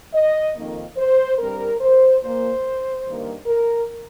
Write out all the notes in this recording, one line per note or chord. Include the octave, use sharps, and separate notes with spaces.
D#5
F2 D#3 A#3
C5
G2 G3 C4 A#4
C5
A#2 A#3 C5
G2 D#3 A#3
A#4